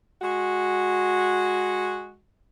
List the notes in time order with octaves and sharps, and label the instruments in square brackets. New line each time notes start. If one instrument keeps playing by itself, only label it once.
[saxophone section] G#3 F#4